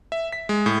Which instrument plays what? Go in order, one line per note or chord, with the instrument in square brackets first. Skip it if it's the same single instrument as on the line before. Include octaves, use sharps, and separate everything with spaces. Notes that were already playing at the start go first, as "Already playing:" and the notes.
[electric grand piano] E5
B6
G#3
A2